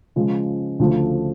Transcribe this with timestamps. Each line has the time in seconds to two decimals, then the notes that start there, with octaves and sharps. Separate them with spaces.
0.16 C#3 F3 G#3
0.79 D2 C#3 F3 A3